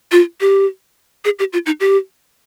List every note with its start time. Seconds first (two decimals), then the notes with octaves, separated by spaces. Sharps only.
0.12 F4
0.41 G4
1.25 G#4
1.39 G4
1.53 F4
1.66 D#4
1.80 G4